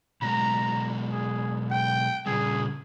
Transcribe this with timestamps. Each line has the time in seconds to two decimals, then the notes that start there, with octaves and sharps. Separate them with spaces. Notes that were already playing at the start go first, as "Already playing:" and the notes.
0.22 B2 F#3 G#3 A#5
1.12 G#4
1.71 G5
2.26 A#2 C#3 G3 G#4